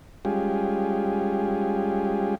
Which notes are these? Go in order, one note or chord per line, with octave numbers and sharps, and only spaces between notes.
G3 G#3 C#4 F4 G4 G#4